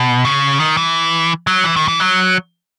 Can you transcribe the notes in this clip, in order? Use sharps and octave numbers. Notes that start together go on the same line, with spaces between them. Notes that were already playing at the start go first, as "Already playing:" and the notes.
Already playing: B2
C#3
D#3
E3
F#3
E3
D#3
E3
F#3